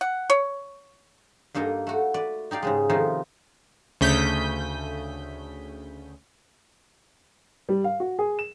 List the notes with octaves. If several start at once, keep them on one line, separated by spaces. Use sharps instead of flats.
F#5
C#5
G2 A#3 D#4 A4 D#5
A3 F#4
B4 D5
D#4 G4 D5 F5
G#2 C#3 G#3
C3 D#3 F3 A3 D#4 F4
D2 C#3 A3 D#6 G6 B6
G3
F5
F#4
G#4
E7